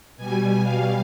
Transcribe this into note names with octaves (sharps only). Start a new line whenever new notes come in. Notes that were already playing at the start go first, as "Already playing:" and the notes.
B2 G3 G#5
F5